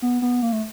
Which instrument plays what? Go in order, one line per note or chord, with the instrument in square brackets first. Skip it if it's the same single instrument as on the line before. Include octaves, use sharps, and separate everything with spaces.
[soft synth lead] B3
B3
A#3
A3